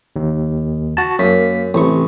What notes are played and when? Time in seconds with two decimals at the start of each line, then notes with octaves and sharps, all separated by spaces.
0.16 D#2
0.97 F#4 A5
1.19 F#2 A#3 B6
1.74 A1 C3 C#6